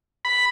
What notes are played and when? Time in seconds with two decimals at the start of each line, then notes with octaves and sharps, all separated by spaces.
0.25 B5